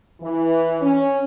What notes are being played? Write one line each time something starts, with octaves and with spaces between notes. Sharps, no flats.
E3
C#4